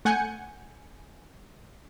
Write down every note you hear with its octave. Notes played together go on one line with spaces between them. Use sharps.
A3 F#5 G#5 G6 C#7